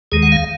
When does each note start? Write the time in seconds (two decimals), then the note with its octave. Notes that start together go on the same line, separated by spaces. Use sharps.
0.12 D#2 D#3 G#3 G#4
0.23 F#5
0.32 F5